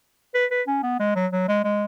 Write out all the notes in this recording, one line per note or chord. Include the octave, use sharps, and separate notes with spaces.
B4
B4
C#4
B3
G#3
F#3
F#3
G#3
G#3